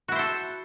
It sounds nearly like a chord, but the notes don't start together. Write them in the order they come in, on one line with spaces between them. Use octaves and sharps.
F#4 E4 C5 A4